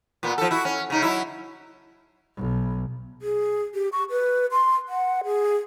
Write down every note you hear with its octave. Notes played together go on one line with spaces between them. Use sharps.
A#2 B3
F3 A4
E4 F#4
C#4
C#3 D#4
F#3 E4
B1
G#4
G4
C#6
B4
C6
F#5
G#4